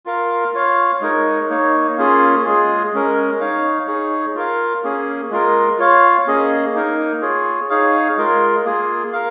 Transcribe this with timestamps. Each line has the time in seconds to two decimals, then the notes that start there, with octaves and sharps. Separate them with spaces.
0.06 F4 A#4 F5
0.53 F4 C#5 F5
1.01 G#3 D#4 A#4 C#5
1.49 A#3 D#4 C#5
1.97 A#3 C#4 F4 G#4
2.44 G#3 F4 G#4
2.93 G#3 C#4 A#4
3.40 D#4 C#5 F5
3.87 D#4 G#4 C#5
4.35 F4 A#4 F5
4.83 A#3 C#4 G#4
5.31 G#3 F4 A#4
5.79 F4 C#5 F5
6.27 A#3 C#4 G#4 D#5
6.74 A#3 D#4 A#4
7.22 F4 G#4 C#5
7.70 D#4 G#4 C#5 F5
8.17 G#3 F4 A#4
8.65 A#3 F4 G#4
9.13 A#4 F5